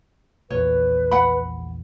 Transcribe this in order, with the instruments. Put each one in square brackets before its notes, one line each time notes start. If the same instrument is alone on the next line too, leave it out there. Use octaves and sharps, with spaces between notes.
[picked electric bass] A#1 E2 [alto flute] B4 [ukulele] C#5
[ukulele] F#5 B5